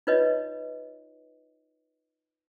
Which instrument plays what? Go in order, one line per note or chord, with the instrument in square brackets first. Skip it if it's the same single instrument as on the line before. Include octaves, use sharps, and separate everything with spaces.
[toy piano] D#4 F4 B4 C#5 D#5